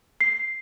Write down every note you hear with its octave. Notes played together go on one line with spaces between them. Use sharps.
C7